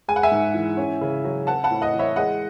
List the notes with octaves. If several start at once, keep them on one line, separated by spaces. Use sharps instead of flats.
G#3 G#5
F#5
E5 G#5
G#2
E3
C#4
C#3
F#3
C4 F#5 A5
F#5 A5
A2
D#5 F#5
E3
C#5 E5
G#3 D#5 F#5